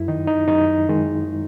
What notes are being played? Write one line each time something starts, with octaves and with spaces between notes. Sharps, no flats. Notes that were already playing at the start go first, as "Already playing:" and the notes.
Already playing: F#2 E4
D#3 D#4
D#4
F#2 D#4
D#3 G#3